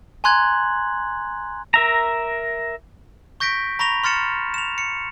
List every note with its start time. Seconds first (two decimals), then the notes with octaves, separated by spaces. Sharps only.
0.24 G#5 A#5 C6 F#6 G#6 F#7
1.74 A#4 E5 A#5
3.40 C#6 G6 A#6 B6 D7
3.79 A#5 B5 C#6 A#6 F7
4.04 C6 F6 A6 C#7 E7
4.54 E7 F7
4.78 C#7